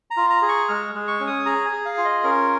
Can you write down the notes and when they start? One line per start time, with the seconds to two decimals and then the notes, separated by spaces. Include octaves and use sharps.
0.11 A#5
0.17 F4
0.30 A#5
0.42 G#4
0.49 C#6
0.69 G#3 F6
0.95 G#3
1.08 C#6
1.20 C#4
1.27 D#6
1.46 G#4 A#5
1.66 G#5
1.72 G#4
1.85 F5
1.98 F4
2.05 D#5
2.24 C#4 A#4